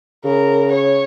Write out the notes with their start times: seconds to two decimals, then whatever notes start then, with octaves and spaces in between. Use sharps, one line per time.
0.24 C#3 A#4
0.72 C#5